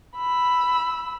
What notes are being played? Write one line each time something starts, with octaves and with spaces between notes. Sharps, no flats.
B5 E6